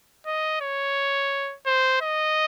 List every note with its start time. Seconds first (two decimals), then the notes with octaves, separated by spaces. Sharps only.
0.26 D#5
0.61 C#5
1.66 C5
2.01 D#5